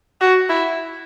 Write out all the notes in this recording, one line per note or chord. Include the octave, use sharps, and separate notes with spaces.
F#4
E4